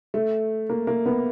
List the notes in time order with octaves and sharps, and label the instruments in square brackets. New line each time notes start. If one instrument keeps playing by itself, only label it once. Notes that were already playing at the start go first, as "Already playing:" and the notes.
[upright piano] A3
A#3
A#3
B3